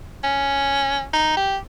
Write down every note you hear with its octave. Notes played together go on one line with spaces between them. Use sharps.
C#4
D#4
G4